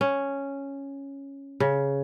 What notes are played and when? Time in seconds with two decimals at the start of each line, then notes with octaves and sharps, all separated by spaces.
0.01 C#4
1.60 C#3